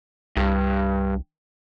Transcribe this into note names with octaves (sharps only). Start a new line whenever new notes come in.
C2 G2